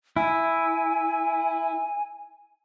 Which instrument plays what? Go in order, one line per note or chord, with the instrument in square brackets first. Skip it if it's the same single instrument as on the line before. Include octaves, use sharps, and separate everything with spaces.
[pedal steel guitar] E4 [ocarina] G#5